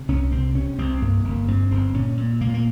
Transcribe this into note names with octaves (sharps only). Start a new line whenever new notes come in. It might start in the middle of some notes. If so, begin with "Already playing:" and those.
Already playing: C3
C2 C#4
C3 C4
C3 C#4
C2 C4
G2 A#3
G1 A#3
G2 C4
G1 C4
A#2 C#4
A#2
A#2 A#3
A#3